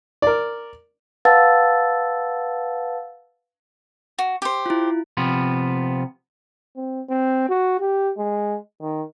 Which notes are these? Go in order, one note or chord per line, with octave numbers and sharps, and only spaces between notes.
A#4 D5
B4 F5 F#5 A5 E6 A6
F#4
G4 C5
E4 F4
C3 F3 B3
C4
C4
F#4
G4
G#3
D#3